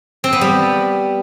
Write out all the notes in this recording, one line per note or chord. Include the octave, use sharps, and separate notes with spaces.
C4
B3
G3